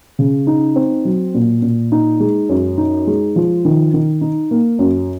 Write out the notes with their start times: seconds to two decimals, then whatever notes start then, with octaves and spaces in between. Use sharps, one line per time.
0.19 C#3
0.47 D#4
0.76 C4
1.05 F#3
1.34 A#2
1.62 A#2
1.92 D#4
2.20 G#3
2.49 F#2
2.78 D#4
3.07 G#3
3.36 F3
3.65 D#3
3.94 D#3
4.21 D#4
4.51 A#3
4.79 F#2